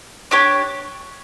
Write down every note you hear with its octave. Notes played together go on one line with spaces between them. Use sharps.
D4 G4 C#5